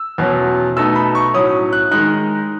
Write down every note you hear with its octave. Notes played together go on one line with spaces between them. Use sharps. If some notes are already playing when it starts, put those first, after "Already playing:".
Already playing: E6
E2 B2 F#3 C#4
B2 A3 D#4 E6
B5
C#6
A2 F#3 C#4 D#6
F#6
D#3 G#3 D#4 F#6